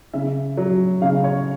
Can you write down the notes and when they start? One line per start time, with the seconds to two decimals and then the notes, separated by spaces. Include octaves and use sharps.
0.14 C#3 E5
0.57 F#3
1.02 C#3 F5
1.24 C#5